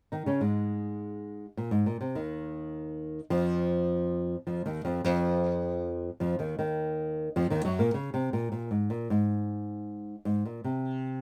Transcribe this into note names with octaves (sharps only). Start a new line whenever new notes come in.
D#3 D#4
C#3 C#4
G#2 G#3
A#2
G#2
A#2
C3
D#2 D#3
F2 F3
F2 F3
D#2 D#3
F2 F3
F2 F3
F2 F3
D#2 D#3
D#2 D#3
F2 F3
D#2 D#3
F#2 F#3
A#2 A#3
C#3
C3
A#2
A#2
G#2
A#2
G#2
G#2
A#2
C3